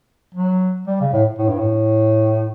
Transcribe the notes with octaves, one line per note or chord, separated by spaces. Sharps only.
F#3
G3
C#3
A2
A2
G2
A2